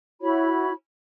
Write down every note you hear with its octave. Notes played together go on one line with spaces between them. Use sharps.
E4 F#4 C#5 B5